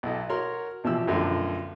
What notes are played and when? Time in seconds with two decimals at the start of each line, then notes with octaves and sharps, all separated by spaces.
0.03 B1 E4 A4 D#5
0.29 F#4 A#4 C#5 F#5 C6
0.84 A1 B2 F3 G4 E6
1.07 B1 F#2 D3 F3 A3